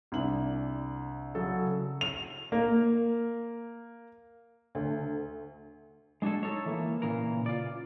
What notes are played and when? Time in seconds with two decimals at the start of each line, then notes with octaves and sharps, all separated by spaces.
0.12 C2 D4 F#7
1.35 C#3 F#3 A4
2.01 F7
2.52 A#3
4.75 D2
6.22 G#3 D4 F#4 G#4 A4
6.43 D#4 A4 C#5
6.66 E3 A#3
7.02 A#2 C#3 E3 A#4
7.46 F4 D5